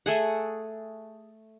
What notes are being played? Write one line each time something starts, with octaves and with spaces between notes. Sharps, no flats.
A3 G#4 F#5